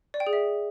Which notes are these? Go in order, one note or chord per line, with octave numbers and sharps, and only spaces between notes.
D5
G5
G#4
E5